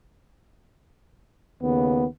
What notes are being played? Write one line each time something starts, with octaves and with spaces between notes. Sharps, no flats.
D#2 C#3 B3